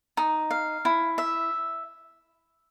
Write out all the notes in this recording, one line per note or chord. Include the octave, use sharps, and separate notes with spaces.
D#4
F5
E4
E5